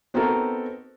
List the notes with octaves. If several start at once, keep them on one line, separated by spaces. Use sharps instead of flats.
B3 C4 D#4 F#4 A4 A#4